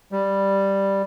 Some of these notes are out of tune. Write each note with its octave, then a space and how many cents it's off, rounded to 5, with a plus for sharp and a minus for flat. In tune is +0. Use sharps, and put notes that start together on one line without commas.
G3 +0